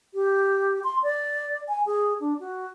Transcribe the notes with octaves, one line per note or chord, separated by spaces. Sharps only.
G4
C6
D5
G#5
G#4
D4
F#4